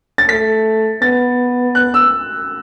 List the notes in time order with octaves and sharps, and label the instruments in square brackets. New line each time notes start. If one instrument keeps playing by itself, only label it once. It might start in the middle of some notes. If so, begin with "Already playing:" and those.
[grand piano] A6
[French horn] A3 [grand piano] B6
[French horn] B3 [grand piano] A6
[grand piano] F#6
E6